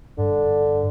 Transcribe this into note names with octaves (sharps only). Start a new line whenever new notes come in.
G2 D3